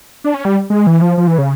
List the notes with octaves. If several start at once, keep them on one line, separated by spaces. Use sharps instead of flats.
D4
C#4
G3
G#3
E3
F3
F3
E3
C#3